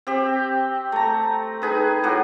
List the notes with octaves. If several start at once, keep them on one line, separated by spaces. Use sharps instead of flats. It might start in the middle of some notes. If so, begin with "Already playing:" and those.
C4 G4
A3 A#5
D#4 G#4 B4
A2 F#4